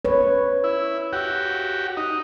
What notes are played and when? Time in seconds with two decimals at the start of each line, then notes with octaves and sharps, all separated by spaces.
0.05 B4 C#5
0.64 E4
1.13 F#4 G4
1.97 D#4